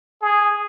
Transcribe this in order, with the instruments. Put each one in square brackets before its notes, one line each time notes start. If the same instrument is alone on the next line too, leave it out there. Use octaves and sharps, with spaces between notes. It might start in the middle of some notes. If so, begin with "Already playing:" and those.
[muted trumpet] G#4